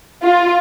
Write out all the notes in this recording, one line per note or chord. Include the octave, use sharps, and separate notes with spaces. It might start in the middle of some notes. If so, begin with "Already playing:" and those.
F4